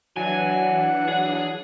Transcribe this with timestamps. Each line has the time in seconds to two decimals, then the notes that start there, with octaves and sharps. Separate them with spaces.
0.16 E3 F#3 D4 F#5 G#5
1.08 F#3 G#4